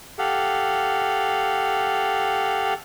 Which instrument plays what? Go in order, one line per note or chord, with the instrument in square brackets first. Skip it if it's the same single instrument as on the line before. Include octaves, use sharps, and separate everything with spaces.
[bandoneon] G4 A4 F5 F#5